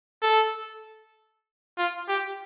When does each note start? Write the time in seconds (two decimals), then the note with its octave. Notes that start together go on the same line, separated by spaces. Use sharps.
0.22 A4
1.78 F4
2.08 G4